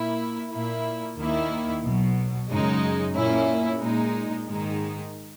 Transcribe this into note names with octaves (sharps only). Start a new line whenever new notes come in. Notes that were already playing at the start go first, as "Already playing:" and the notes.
Already playing: A#2 A#3 E4
A#2 A#3 E4
D#2 D#3 A#3 E4
B1 B2 F#3
F#2 C#3 G#3 D#4
A#2 A#3 C#4 E4
A#2 G#3 D#4
G#2 D#3 G#3 D#4